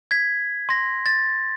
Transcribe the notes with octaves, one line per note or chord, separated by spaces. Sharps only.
G#6 B6
C6 A#6
A6